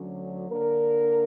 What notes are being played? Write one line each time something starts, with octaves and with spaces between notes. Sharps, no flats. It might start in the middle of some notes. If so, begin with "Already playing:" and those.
Already playing: D2 D3 F#3 C#4
D3 A#3 D4 A#4